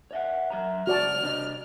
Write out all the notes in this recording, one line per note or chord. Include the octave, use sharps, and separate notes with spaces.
C#5 E5 F#5
F#3 E5 A#5
C#2 F#4 D5 A5 F6
C3 D4 D#5